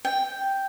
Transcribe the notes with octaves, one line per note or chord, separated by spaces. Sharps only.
G5